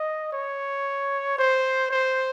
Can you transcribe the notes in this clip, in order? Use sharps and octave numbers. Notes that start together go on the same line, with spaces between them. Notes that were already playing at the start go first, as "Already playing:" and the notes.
Already playing: D#5
C#5
C5
C5